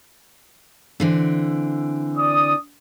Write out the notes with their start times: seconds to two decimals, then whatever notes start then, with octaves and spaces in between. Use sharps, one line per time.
1.00 D3 E3 C4
2.18 D5 D#6